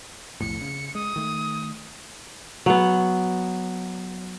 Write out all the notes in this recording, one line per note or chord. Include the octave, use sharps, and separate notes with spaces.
B1 F2 A2 C#7
C#3
G#3 D#6
D#3 A3
F#3 B3